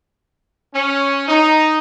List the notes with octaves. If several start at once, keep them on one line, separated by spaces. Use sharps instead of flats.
C#4
D#4